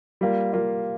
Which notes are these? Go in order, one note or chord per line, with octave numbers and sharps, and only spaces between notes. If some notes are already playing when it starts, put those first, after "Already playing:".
G3 A#3 F4
G3 A#3 F4